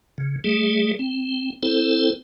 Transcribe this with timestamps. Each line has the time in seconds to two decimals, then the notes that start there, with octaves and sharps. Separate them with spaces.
0.18 C#3
0.44 G3 A3 G#4
0.99 C4
1.63 C4 E4 A4 C5